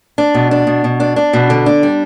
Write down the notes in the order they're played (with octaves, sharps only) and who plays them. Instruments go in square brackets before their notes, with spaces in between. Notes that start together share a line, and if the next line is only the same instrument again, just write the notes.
[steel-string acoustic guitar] D4
B2
D4
B2
B2
D4
D4
B2
D3
D4
G3